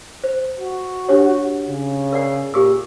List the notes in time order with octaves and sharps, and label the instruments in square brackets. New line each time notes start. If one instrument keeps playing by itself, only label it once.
[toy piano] C5
[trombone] F#4
[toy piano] D4 G4 C#5
[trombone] C#3
[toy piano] A#4 D5 F#5
[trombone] A#2 [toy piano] G4 G#4 E6